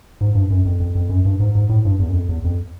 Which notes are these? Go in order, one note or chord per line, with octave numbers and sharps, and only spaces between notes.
G#2
G2
F#2
F2
F2
F2
F#2
G2
G#2
G#2
A2
G2
E2
F#2
F2
E2
F2